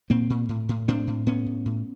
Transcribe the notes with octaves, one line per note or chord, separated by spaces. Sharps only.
A#2 A#3 C4
A#2
A2
A2
A2 C4 D4
A2
A2 B3 C#4
A2
A2